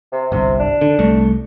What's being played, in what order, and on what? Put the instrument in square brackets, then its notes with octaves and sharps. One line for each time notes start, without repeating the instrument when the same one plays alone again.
[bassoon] C3
[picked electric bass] G1 C2 [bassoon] C3
[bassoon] D4
[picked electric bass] D3
C2 A3